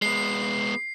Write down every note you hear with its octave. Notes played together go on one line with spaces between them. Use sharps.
G#3 B3 C7